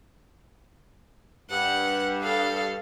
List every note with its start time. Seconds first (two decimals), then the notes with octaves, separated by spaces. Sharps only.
1.50 G2 F#5
2.23 A4 F5